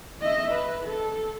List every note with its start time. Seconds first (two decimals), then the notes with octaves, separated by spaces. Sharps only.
0.21 D#5 E5
0.52 B4
0.84 A4